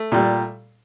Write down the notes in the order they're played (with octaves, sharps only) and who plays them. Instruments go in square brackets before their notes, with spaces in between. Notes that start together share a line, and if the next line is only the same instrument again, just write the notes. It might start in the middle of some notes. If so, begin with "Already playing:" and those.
Already playing: [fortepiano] A3
A#2 G3